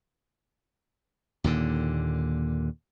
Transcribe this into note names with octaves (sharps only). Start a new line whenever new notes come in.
D#2 A#2 D3